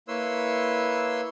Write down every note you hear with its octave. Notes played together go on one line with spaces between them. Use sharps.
A#3 E4 B4 C#5 C6 E6